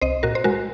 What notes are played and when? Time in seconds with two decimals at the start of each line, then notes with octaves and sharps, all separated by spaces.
0.02 C2 C5 D#5
0.23 A#2 F#4 A#4
0.35 C5
0.44 G#3 F#4 A#4